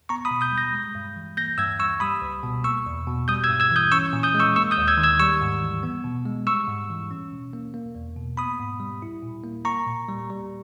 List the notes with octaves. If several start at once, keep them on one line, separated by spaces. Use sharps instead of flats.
B3 A#5 C#6
B5 D#6
B2
D#6 G6
G3
G6 A#6
G#3
G2
E3
A#3 G6 A#6
G2 E6 G#6
G3 C#6 E6
G3 B5 D#6
C#2
B2
A#3 C#6 E6
E2
B2
G3 D#6 G6
E6 G#6
G2
E6 G#6
E3 D#6 G6
C#4 C#6 E6
A#2
D#6 G6
G#3
C#6 E6
A#3 C#6 E6
D#6 G6
D#2
E6 G#6
D#3
E6 G#6
G3 C#6 E6
G#2
E3
B3
B2
G#3
G3 C#6 E6
G#2
E3
C#4
B2
A#3
A#3
E2
B2
B3 B5 D#6
G#2
G3
E4
A#2
A#3
A#3 A#5 C#6
A#2
G3
G3